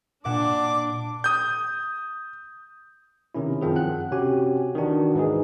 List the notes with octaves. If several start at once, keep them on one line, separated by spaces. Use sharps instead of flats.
A#2 D4 F#5 D6 E7
D#6 G6
C3 D#3 C#4 E4
F#2 D#3 F3 C4 G#4
F#5 F#6
C3 C#4 F#4 G4 G#5
D#3 E3 D4 F#4
G#2 E3 D#4 G#4